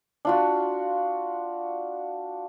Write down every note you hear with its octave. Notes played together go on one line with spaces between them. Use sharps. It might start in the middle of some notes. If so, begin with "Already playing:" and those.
D4 F4 F#4